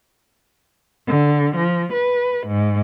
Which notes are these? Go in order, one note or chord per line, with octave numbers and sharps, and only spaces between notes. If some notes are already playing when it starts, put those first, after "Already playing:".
D3
F3
B4
G#2